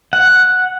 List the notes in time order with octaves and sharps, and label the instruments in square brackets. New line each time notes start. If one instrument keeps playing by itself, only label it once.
[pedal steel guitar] F#5